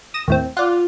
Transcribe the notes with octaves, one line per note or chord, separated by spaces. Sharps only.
D#6 A#6 E7
D#2 A2 C4
F4 D5 F#5